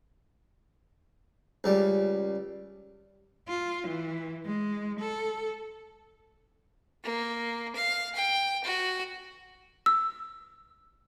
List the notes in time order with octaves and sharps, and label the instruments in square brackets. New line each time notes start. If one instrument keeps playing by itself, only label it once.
[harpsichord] C#2 G3
[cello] F4
E3
G#3
A4
[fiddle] A#3
F5
G5
F#4
[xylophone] E6